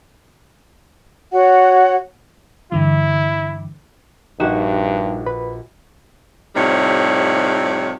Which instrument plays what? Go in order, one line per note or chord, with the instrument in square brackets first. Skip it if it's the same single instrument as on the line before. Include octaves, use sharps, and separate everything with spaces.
[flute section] F#4 C#5 F#5
[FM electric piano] G2 D3 E3 [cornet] E4
[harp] A#1 F#4 E7 [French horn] G2 [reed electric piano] D#4 G4
[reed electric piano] B4 B5
[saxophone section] A2 C3 F3 G3 D#4 C#5